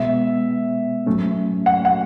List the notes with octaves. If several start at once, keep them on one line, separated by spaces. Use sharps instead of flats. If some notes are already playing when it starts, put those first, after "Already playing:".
Already playing: B2 G#3 B3 E5
G#2 F#3 A3 C#4
F#5
F#5